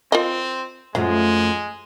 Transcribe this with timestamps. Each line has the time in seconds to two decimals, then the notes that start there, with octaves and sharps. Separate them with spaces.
0.12 C4 F4 A#4 D#5
0.95 F#2 F3 F#3 G#3 A3